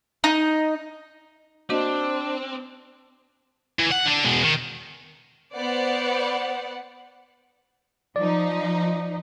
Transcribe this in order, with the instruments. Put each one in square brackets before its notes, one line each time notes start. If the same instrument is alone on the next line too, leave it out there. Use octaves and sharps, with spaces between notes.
[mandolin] D#4
[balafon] A#3 F#4 D#5 [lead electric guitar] C4 [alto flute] D4 [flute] C5
[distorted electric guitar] E3
F#5
D3 D4
B2 G#3
D#3
[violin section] B3 C5 D5 F#5
[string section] F3 D#4 [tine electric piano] D5